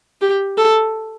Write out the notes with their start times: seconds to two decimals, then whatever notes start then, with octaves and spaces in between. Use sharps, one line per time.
0.21 G4
0.58 A4